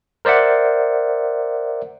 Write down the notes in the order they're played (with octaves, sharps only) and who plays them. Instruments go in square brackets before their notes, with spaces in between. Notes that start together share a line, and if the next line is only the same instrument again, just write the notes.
[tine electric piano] A#4 C5 D5 E5 F#5